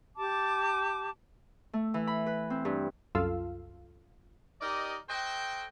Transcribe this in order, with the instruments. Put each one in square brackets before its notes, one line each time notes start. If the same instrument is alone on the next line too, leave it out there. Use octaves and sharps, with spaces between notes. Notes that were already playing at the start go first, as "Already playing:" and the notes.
[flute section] G4 A5 D6
[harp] A3
E3
B5
B4
C4
G2
[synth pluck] C2 F#2 F4 A4 F5 E6
[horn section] D#4 G4 A#4 D5 D#5
F#4 A4 C5 D#5 G5